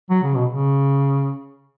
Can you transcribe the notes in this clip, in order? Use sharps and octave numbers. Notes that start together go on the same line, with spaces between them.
F#3
C#3
B2
C#3